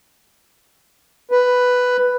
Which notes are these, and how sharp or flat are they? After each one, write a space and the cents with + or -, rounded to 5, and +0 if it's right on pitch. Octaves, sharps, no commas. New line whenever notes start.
B4 +5